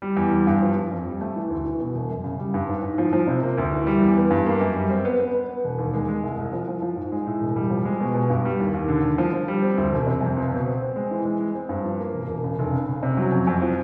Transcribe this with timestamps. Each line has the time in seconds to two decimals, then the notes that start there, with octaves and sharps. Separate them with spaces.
0.02 G3
0.17 E2
0.32 G3
0.47 G2
0.61 F3
0.76 F3
0.91 F2
1.05 G3
1.21 A3
1.36 E3
1.50 D2
1.65 E3
1.80 B2
1.95 E1
2.09 F#2
2.24 C#3
2.39 G3
2.54 G2
2.68 G#2
2.83 G#2
2.98 F3
3.13 F3
3.27 C3
3.43 A#3
3.58 D2
3.72 E3
3.87 G3
4.02 E2
4.16 B3
4.30 G2
4.46 A#3
4.60 F#2
4.76 G3
4.90 C4
5.05 B3
5.20 B3
5.34 B3
5.49 B3
5.64 E1
5.79 D#2
5.93 G#3
6.08 G#3
6.23 C2
6.38 C2
6.53 F3
6.68 F3
6.82 F3
6.96 G#2
7.12 G#3
7.27 A2
7.41 E1
7.56 G3
7.70 F3
7.85 G#3
8.00 B2
8.15 B2
8.30 G2
8.45 G3
8.60 D#2
8.74 D#2
8.88 D3
9.04 D3
9.18 F3
9.33 F3
9.48 G3
9.62 C4
9.78 D2
9.92 E1
10.07 C3
10.21 F2
10.36 C#2
10.51 B2
10.66 C4
10.81 C4
10.96 G#3
11.11 E3
11.25 G#3
11.40 G#3
11.55 C4
11.69 G2
11.84 F3
11.99 A#3
12.14 E1
12.28 E1
12.44 C#3
12.59 F1
12.73 C#3
12.88 C#3
13.03 C3
13.17 F#3
13.32 F2
13.47 F2
13.62 F3